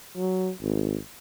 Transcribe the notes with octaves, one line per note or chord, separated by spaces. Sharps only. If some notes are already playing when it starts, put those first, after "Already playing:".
F#3
G#1